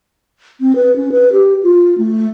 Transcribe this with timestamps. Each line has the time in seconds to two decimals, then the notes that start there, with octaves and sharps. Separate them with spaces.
0.60 C4
0.76 B4
0.96 C#4
1.12 B4
1.32 G4
1.63 F4
1.98 A3